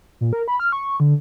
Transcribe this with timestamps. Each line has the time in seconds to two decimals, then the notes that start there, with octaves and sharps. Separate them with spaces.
0.21 A#2
0.33 A#4
0.48 B5
0.60 F6
0.72 C#6
1.00 D3